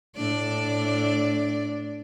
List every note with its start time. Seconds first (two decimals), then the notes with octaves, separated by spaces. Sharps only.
0.17 A2 D4 D5